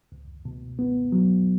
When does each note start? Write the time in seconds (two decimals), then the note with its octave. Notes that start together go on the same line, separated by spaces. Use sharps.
0.12 C#2
0.45 B2
0.79 B3
1.12 F#3